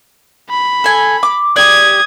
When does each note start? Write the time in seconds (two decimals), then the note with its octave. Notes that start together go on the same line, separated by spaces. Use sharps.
0.50 B5
0.84 A4 G#5
1.23 D6
1.56 G4 D5 D#6 G#6